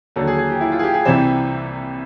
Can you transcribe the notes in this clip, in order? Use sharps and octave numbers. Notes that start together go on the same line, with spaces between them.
D#2 D3 F#3 A4
G#4
G#4
G4
E4
F4
G#4
G4
G#4
C2 C3 E3 G3 C5